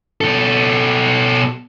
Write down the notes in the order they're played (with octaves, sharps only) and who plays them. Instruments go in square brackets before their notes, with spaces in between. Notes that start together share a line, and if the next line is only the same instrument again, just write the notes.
[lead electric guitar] B2 A4